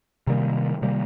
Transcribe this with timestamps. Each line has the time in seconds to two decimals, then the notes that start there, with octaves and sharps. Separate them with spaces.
0.27 C3 D#3 G3 A#3
0.82 C3 D#3 G3 A#3